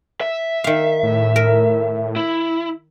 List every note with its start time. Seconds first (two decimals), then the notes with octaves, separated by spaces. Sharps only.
0.21 E5
0.64 D#3 F5
1.03 A2
1.36 A#4
2.16 E4